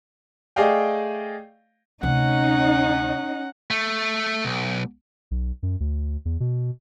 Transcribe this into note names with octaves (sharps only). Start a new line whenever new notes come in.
A3 G#4 D5 D#5 F5 G5
D2 C3 C#4 D#4 F#5
A3
B1
B1
F#2
D2
E2
B2